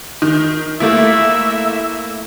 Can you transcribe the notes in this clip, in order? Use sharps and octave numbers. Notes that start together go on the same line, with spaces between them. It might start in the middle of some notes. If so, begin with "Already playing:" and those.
D#3
A3 A#3 E4 E5